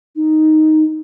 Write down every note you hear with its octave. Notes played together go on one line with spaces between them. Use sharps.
D#4